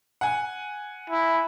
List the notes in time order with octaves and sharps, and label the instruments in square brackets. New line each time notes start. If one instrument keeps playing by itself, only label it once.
[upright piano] F#5 G#5
[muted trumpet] E4